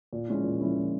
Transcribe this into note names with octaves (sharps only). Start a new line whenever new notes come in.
A#2
F3 G#3 C#4 E4
A#2
F3 G#3 C#4 E4
A#2